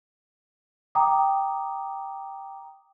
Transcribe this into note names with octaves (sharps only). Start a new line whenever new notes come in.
G5 A#5 D6 D#6